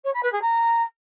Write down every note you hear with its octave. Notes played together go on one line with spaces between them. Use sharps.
C#5
B5
B4
G#4
A#5